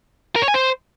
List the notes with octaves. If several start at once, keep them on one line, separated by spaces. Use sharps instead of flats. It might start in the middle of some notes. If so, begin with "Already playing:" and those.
A#4
C#5
G#5
C5